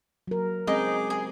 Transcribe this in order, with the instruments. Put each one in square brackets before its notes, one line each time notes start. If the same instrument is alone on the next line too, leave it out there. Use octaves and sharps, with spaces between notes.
[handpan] F#3 A#4
[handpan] G#3 C4 C#4 [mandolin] D#4 [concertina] G#4 D6
[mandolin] G#4